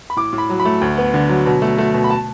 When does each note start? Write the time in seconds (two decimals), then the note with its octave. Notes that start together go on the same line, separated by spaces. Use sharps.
0.10 B5
0.16 A2 D6
0.33 A2
0.38 B5
0.50 F#3
0.59 B5
0.65 A3
0.81 D2
0.98 B3
1.14 D3
1.29 F#3
1.46 B2
1.62 A3
1.78 A3
1.94 B2
2.04 B5
2.10 A5